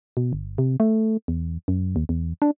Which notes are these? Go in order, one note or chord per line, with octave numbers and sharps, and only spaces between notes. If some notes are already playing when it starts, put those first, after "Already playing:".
B2
G1
C3
A3
E2
F#2
D#2
E2
D4